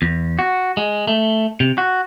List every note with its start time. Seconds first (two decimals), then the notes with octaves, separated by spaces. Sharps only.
0.02 E2
0.39 F#4
0.77 G#3
1.07 A3
1.60 C3
1.78 F#4